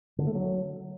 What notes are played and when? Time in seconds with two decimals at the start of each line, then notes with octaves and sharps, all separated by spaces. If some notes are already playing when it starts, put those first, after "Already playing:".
0.18 D3
0.27 A3
0.35 F#3